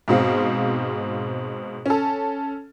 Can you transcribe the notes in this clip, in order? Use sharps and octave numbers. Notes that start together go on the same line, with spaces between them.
G#2 B2 C4 F5
C#4 A4